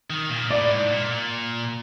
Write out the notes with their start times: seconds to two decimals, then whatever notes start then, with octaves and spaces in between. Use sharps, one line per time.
0.10 D#3
0.30 A#2
0.50 A2 D5
0.70 G#2
0.90 A#2